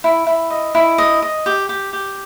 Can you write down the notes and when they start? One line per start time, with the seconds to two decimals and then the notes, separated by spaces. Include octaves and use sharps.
0.04 E4
0.27 E4
0.50 D#5
0.75 E4
0.98 D#5
1.22 D#5
1.46 G4
1.69 G4
1.93 G4